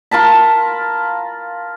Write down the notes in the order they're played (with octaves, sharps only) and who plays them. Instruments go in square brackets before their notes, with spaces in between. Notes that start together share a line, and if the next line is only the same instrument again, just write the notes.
[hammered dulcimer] F4 A#4 A5 B5